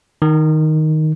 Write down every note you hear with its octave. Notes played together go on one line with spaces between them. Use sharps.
D#3